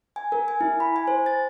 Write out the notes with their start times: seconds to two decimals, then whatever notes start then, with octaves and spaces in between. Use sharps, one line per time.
0.16 G#5
0.32 A#4
0.48 G#5
0.61 E4
0.80 B5
0.96 G#5
1.08 C5
1.26 A6